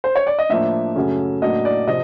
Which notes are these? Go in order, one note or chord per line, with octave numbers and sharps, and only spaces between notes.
C5
C#5
D5
D#5
A2 F3 A#3 D4 E5
F#2 C#3 F#3 A3 C#4
A2 F#3 A#3 D4 D#5
D5
C3 F3 D#5